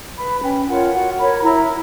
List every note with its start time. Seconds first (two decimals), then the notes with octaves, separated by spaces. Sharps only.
0.18 B4 B5
0.43 C#4 G5
0.68 F4 A#4 C#5 F#5
0.93 F#4 F#5
1.18 A#4 C#5 B5
1.38 B5
1.42 E4 A#5